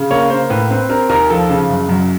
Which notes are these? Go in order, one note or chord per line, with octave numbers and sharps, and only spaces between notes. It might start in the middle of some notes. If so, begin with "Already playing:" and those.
Already playing: C#3
A#3 C#5
A#3 C5
A2 B4
C4 B4
C4 A#4
D#2 A#4
F3 A4
C#3
F#1
F#2